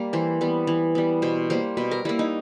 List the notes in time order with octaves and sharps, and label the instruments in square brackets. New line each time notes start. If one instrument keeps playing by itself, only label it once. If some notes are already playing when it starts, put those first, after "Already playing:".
Already playing: [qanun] G3 A#3
E3 C5
G3 B3
E3
G3 B3
B2 C5
G3 A#3 C5
B2 B4
A#4
G3 A#3 E4
D#4